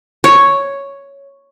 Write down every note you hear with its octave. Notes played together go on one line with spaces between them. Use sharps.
C#5